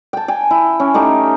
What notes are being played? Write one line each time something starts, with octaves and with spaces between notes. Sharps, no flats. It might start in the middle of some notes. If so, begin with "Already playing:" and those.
G5 A5
G5 G#5
E4
C#4
A3 D#4 G4 C#6